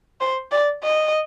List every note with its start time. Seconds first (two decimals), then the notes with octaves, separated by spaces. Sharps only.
0.21 C5
0.52 D5
0.83 D#5